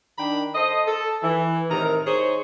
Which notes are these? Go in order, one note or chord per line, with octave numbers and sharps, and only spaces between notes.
D#3 D4 G5 A#5 B5
A4 C5 D#5
A4
E3
A2 C3 D#3 A#4 A#5
D#4 G#4 C5 C#5